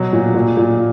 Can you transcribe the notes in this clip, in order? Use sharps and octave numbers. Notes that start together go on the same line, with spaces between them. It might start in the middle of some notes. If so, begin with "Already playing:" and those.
Already playing: B2 F#3
A#2
A#2
A#2